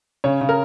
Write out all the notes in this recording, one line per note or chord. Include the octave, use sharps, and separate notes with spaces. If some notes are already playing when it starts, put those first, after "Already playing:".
C#3 C#5
C#3
A#4